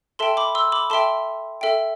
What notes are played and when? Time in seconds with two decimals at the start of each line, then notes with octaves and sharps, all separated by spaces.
0.19 A4 E5 G5 A5 C6
0.37 B5 D6
0.55 C6 E6
0.72 B5 D6
0.90 A4 E5 G5 A5 C6
1.61 A4 E5 G5